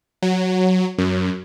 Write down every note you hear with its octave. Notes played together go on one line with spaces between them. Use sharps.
F#3
F#2